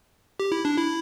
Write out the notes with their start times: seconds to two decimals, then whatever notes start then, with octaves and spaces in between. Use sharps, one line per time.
0.40 G4
0.52 E4
0.65 D4
0.78 E4